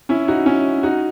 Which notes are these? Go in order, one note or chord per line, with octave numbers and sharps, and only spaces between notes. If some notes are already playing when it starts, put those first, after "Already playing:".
C#4 E4
D#4 F#4
C#4 E4
D#4 F#4